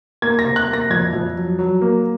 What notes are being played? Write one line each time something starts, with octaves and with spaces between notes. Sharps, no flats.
A#3 G#6
A#6
C3
F#6
A#3
A#6
F2 G#6
F2
F#3
F#3
A#3